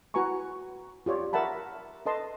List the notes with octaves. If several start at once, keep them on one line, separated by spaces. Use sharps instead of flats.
E4 F#4 B4 G#5 A#5 C#6
F4 G4 C#5 D5
A#4 E5 F#5 A5 B5
A4 B4 D#5 A5 C6